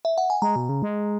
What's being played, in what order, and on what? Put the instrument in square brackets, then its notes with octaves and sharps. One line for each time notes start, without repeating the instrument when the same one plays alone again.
[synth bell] E5
F#5
G#5
[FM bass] G#3 [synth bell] A#5
[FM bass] B2
C#3
G#3